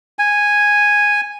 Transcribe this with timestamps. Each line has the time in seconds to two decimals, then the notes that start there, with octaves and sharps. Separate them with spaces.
0.19 G#5